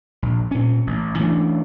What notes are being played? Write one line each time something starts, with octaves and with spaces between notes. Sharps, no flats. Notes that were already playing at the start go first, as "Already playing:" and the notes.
A#1
A#2 C#4
A1
E3 A3 C#4 D4